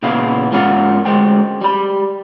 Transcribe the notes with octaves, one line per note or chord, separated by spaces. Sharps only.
A#2 C#3 B3 E4 F5
G#2 C#4 F4 A#4 F5 F#5
D2 G#3 C5 G5
G3 B5